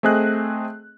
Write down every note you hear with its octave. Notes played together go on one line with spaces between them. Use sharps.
A3 C4 G#4 D#5 F#6